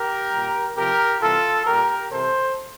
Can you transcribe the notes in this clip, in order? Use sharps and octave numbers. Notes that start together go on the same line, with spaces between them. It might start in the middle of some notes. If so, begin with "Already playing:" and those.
Already playing: G4 A#4
A#2 G3
C3 F3 G4 A#4
C3 E3 G3 F4 A4
A#2 G3 G4 A#4
C3 E3 G3 A4 C5